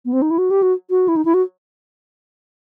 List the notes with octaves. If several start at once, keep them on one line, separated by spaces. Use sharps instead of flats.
B3
C4
D#4
E4
F#4
G4
F#4
F#4
E4
D#4
E4
F#4